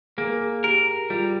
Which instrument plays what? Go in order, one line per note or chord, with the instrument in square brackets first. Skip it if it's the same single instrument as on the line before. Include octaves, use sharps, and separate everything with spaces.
[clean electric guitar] A#3 [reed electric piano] G#4
[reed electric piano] A#4
G#4
[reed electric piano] G4 [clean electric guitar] A#4
[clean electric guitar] G3 [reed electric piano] F4